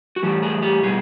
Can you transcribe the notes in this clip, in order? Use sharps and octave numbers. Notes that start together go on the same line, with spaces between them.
F#4
A2 E3 G3 G4
G#4
G4
B2 G3 G#4